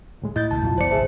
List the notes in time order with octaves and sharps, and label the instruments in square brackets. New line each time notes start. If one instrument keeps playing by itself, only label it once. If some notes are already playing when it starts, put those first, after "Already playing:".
[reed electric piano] D2 A2 G#3
[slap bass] A2 [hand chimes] E4 [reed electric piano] D#5 G6 A6
[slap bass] C#2 B2 A3 [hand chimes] A5
[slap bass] F#2 B2 [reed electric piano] F#3 F4
[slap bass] E1 G#3 B3 [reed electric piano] D#2 D5 [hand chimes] C5 C#7
[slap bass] G#1 C#2 G2 [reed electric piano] G#4 E5 A5 [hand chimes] C5